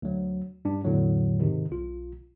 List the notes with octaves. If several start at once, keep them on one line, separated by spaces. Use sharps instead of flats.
D2 F#3
G2 D4
E2 A2 D3 F#3
G#2 C3 D#3
B1 F4